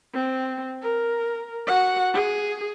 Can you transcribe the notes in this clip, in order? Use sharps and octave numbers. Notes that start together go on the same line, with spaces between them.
C4
A#4
F#4 F#5
G#4